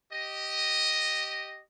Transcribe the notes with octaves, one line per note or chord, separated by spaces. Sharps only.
G4 D#5